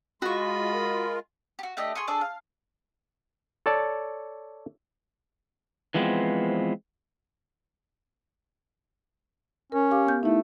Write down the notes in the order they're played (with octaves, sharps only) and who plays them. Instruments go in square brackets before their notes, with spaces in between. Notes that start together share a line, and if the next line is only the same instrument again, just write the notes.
[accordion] G#3 F4 [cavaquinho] F#4 C#6 [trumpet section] D#5 B5
[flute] A#4
[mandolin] F#4 G4
A3 D4 G4 D#5
G#4 C6 C#6 D#6
D4 G#4 A4 D5
F5
[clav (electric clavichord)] A4 C#5 D5 A5
[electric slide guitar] E3 F3 G#3 B3 C4
[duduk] C#4 [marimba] A#4
[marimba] G4 F5 D6
B3 G6
[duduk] A3 [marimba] D#4 E4